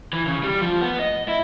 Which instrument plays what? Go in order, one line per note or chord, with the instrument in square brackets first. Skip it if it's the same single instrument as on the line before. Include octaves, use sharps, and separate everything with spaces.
[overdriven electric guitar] E3
C#3
G3
F3
B3
D#5
E4